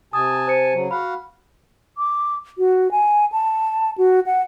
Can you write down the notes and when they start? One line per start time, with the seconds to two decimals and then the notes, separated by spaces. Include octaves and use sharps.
0.13 C3 G#5 A5 D#6
0.47 C5 C#7 D#7
0.73 C#3 F#3
0.91 F#4 F5 F#5 B5
1.98 D6
2.58 F#4
2.91 G#5
3.32 A5
3.98 F#4
4.26 F#5